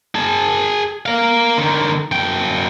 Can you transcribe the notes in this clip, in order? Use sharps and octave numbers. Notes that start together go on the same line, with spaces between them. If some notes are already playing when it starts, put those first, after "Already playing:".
G#4 A5
A#4 F5
D3 D#3
F#2 G5